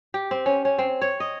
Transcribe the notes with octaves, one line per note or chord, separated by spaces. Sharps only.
G4
C4
C#4
C#4
C4
C#5
D#5